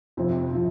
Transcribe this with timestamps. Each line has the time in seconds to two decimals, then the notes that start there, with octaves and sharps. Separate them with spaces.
0.17 F2 C3 F3 C4
0.53 C3 F3